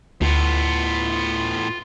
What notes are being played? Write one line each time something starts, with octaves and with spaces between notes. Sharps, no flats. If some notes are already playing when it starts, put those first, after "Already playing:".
D2 A2 B3 F4